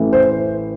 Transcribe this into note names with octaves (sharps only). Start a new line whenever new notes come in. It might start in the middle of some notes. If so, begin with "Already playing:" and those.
Already playing: A1 A2 E3
C5